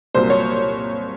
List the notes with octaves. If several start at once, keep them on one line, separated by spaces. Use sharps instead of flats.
C2 A#2 F#3 A#3 C5
C#5